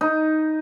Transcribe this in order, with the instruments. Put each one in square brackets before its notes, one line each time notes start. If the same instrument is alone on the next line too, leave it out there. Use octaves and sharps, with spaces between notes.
[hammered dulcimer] D#4